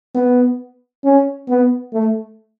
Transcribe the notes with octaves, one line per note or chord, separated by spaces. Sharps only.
B3
C#4
B3
A3